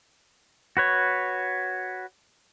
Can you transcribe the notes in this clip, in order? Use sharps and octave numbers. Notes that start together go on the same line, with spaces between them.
F#4 B4 C#5